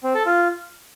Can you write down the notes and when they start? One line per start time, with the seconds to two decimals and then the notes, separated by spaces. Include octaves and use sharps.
0.03 C4
0.15 A4
0.26 F4